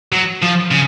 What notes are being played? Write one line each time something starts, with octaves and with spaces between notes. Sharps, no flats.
F#3
F3
C#3